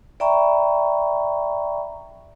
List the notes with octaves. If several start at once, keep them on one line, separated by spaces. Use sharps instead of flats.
D5 E5 G5 A#5 B5 C#6